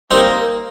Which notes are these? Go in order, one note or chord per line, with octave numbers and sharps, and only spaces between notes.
D#3 G3 A#3 C4 D#4